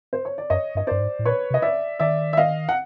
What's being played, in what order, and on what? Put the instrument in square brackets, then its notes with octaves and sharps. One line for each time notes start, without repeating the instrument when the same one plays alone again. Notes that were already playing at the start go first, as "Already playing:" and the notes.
[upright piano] C5
C#5
D5
[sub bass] F#2 [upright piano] C#5 D#5
[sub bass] G2 [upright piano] D#5
[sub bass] G2 [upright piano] C5 D5
[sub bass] G#2
A2
[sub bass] A#2 [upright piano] B4 C#5
[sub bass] C3
[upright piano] D#5
D5 E5
[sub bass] D#3 [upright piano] D5 E5
[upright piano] E5
D#5 F5
F#5